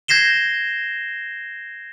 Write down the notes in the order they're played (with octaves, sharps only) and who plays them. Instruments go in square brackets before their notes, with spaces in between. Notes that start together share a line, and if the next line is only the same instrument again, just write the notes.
[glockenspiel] G6 G#6 A#6 C7 E7 G7